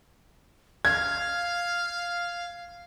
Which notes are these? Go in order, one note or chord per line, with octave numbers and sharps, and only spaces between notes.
F5 G#6